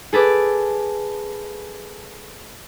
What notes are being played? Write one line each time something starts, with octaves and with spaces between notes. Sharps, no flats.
G#4 A4 B4 D6